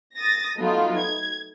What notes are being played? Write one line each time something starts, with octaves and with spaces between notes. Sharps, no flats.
D#6 A6 A#6
F#3 A3 B3 D#4 F4
G#6